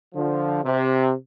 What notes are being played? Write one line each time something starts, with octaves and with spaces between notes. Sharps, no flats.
D3 F3
C3